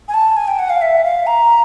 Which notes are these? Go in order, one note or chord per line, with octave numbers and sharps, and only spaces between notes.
G#5
A5
G#5
G5
F#5
F5
E5
F5
A#5